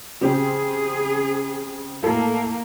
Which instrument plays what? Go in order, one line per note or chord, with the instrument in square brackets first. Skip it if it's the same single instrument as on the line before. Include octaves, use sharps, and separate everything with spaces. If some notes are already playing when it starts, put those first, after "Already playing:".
[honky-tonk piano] C#3 C4 G4 [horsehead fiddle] G#4
[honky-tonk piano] A2 A4 [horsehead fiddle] A#3